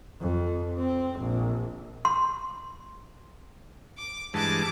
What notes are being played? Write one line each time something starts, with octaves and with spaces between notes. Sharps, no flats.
F2
C4
A#1
C6
D6
G2 E3 G#3 A5 D6